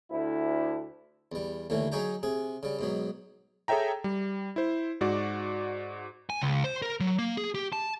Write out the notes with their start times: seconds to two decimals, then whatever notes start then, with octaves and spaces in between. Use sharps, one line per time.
0.11 D2 E4
1.32 E2 G3
1.70 D#2 A2 D3 E3 A3
1.92 F#3 D#4 G#4 C#5 G5 A#5
2.23 C3 G#4
2.63 C#3 G3
2.79 G#2 B2 F#3
3.68 G#4 A4 C#5 E5 G5 A#5
4.04 G3
4.56 E4 C5
5.01 G#2 F#4 D5 D6
6.30 G#5
6.42 C#2
6.64 C5
6.82 A#4
7.00 F#3
7.19 A#3
7.37 G#4
7.55 G4
7.73 A5